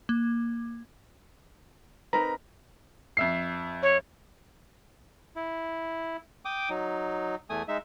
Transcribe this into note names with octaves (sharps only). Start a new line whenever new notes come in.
A#3
C4 D#4 A#4 B4 A#5
F2 E5 C7
C#5
E4
G5 D6 D#6
F#3 D#4
E2 A3 G#5 D#6
G#3 D#4 E5